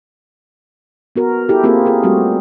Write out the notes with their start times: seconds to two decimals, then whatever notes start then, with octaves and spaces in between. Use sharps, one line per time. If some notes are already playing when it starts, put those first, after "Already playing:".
1.16 B3 F#4 A#4
1.49 E4 G4 A4
1.64 A#3 C4 F4 G4 G#4 A#4
1.86 F4 G#4 A#4
2.03 G3 A3 C4 F#4 G4